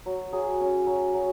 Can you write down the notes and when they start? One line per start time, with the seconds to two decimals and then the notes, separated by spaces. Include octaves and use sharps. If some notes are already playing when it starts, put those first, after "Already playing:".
0.06 F#3
0.33 F#3 G#4
0.60 C#4
0.86 F#3
1.14 F#3